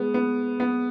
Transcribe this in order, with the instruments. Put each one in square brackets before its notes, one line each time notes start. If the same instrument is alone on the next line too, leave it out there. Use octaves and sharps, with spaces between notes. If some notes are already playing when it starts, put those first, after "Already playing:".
Already playing: [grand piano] G#3 [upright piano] B3
[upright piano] B3
B3